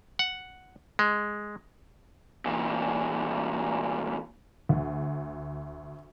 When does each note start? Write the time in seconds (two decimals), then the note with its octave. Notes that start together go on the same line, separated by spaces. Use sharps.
0.19 F#5
0.99 G#3
2.45 E2 A#2
4.69 D2